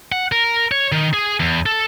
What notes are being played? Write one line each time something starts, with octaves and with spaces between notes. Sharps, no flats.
F#5
A#4
C#5
D#3
G#4
E2
A4